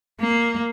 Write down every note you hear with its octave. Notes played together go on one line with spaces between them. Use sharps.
A#3